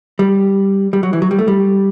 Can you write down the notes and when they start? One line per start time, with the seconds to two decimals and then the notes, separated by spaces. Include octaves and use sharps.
0.19 G3
0.93 G3
1.03 F#3
1.13 E3
1.22 F#3
1.31 G3
1.39 A3
1.48 G3